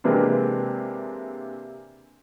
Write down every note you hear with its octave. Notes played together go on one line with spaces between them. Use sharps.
C3 E3 G#3 A#3 C4 D4